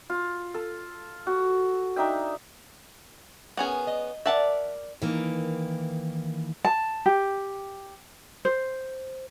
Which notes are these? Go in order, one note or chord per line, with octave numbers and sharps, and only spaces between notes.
F4
A4
F#4
D4 D#4 E5 G5
B3 C#4 G#4 A#4
D#5
A#4 D5 E5 F#5 A5
D#3 E3 A#3
A5
G4
C5